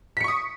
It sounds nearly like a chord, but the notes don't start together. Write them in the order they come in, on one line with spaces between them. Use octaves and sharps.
B6 C#7 C#6 D#6